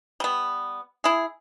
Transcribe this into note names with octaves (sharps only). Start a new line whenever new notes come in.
G3 B3
E4 G#4